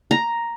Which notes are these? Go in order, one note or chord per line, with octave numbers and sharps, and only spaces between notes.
A#5